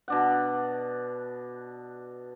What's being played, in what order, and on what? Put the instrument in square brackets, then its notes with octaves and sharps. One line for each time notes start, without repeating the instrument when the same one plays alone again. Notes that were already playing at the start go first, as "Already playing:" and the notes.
[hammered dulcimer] B2 D4 F#5